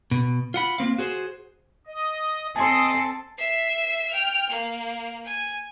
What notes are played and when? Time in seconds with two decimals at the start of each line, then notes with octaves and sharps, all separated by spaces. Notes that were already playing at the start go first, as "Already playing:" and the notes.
0.11 B2
0.54 F4 F#5 B5
0.78 A#3 C4 F5
0.98 F#4 G#4 C5
1.87 D#5
2.56 C4 A4 D#5 G#5 A5 C6
3.38 E5 C7
4.10 G5 F6
4.49 A#3
5.25 G#5